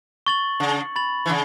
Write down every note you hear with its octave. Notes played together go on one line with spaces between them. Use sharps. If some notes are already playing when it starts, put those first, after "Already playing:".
C#6 A6 F#7
C#3
B5 A6 F#7
E3
C#3